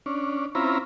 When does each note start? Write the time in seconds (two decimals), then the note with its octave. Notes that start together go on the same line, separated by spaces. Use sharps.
0.06 C#4 D4
0.55 C4 C#4 E4 F4 A#5 B5